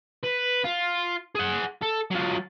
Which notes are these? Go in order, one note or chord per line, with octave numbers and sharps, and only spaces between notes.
B4
F4
G#4 F#5
A4
F#3 F4